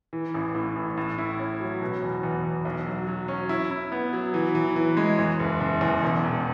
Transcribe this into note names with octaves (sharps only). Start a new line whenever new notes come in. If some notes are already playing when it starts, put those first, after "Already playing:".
E3
A1
A2
A1
A2
E4
C#4
F#3
B2
E2
E2
E2
B1
F#3
F#3
C#4
E4
E4
B3
F#3
E3
E3
E3
G#3
E2
F#1
F#1
E2
E1
E1